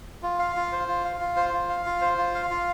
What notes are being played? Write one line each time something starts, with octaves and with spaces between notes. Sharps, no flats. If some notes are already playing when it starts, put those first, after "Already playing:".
F4
F5
F4
C5
F4
F5
F4
C5
F4
F5
F4
C5
F4
F5
F4